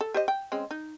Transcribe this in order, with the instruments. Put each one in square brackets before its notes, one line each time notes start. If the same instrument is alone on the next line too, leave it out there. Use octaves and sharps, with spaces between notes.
[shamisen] A4
G4 C5 D#5
G5
G#3 C4 C#4
D#4